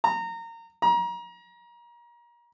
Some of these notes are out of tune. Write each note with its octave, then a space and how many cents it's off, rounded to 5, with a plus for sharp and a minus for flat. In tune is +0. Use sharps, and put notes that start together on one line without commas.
A#5 -25
A#5 +30